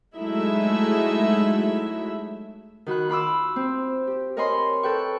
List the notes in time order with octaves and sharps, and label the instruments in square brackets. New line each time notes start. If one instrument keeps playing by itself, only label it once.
[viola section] F#3 G#3 A3 D#4 E4 E5
[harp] D#3 F#4 B5 F#6
F4 B5 D6 E6
C4
G4
A#4 C#5 D#5 G#5 B5 C6
A4 B4 G5 C#6